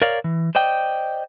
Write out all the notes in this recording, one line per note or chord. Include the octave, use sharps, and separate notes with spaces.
A#4 C#5 D5 F5
E3
C5 D5 D#5 G5